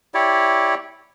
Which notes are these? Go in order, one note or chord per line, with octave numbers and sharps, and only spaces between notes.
E4 G4 C#5 D5